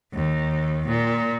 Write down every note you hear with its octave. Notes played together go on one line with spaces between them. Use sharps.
D#2
A#2